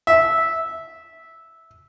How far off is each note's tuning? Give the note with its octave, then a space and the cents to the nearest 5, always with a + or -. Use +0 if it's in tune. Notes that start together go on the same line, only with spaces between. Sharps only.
E5 -10